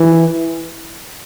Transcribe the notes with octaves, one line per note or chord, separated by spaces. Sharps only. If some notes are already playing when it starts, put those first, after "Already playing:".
Already playing: E3